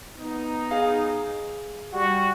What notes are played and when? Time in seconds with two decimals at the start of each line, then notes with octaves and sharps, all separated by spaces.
0.17 B3 D#4
0.71 G#4 F5
1.93 G3 F#4